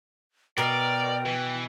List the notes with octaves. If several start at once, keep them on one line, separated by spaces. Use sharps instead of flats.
B2 A#4 D5 G5
E3